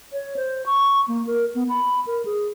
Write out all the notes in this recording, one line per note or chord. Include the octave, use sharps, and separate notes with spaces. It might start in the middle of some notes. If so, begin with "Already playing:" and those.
C#5
C5
C#6
A#3
A#4
B3
B5
A#4
G#4